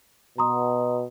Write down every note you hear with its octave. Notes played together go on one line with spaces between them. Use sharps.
B2 A#5 C6 D#6